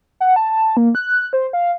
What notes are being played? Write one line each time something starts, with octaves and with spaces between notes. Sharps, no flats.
F#5
A5
A#3
F#6
C5
F5